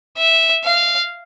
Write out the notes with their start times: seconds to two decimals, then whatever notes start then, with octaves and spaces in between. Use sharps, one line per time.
0.19 E5
0.64 F5